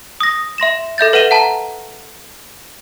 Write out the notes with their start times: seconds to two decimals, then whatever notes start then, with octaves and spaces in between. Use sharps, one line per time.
0.20 D#6 A#6
0.58 E5 C6 A#6 E7
0.98 A4 E5 G6 A6
1.13 B4 E5 F#5 D#7 E7 G7
1.31 F#5 A5 A#5